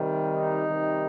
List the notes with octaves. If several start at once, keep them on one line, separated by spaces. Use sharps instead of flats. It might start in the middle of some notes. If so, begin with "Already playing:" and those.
Already playing: C3 D#3 G3
D#4
C3 D#3 G3